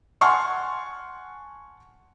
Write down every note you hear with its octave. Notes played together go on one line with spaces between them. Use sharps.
F#5 G#5 A5 C6 C#6 F6